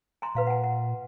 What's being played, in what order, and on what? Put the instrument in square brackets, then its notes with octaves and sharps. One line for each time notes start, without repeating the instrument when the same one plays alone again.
[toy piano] G#5 A#5 C6
[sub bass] A#2 [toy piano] B4 F5 A#5
[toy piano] F#5 G#5
F#5